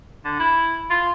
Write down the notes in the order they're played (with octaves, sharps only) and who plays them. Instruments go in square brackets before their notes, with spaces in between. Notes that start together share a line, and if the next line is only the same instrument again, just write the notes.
[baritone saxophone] D3
E4
F4